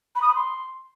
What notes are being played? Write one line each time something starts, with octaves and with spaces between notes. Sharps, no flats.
B5
D#6
B5
C6